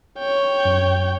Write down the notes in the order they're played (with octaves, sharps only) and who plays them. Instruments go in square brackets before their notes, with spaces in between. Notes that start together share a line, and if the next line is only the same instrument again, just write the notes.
[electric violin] C#5 G5
[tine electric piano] F#2